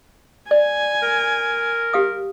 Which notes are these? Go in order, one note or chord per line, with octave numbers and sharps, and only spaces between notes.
D5 G#5
A#4
G4 F5 D#6